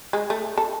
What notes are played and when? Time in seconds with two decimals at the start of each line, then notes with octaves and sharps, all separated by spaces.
0.13 G#3
0.30 A3
0.57 A4